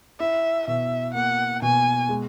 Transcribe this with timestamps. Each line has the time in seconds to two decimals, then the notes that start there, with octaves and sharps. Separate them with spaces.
0.20 E4 E5
0.67 B2 E5
1.14 A#3 F#5
1.62 B2 G#5
2.09 G#3